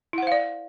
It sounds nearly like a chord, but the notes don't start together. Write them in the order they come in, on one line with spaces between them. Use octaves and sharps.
E4 F#5 C5 F5 D5